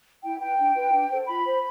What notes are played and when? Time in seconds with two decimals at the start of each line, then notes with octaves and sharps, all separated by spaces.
0.24 E4 G5
0.40 B4 G5
0.58 D4
0.75 F4 B4
0.92 D4
1.10 A4 C5
1.27 F4 B5
1.44 C5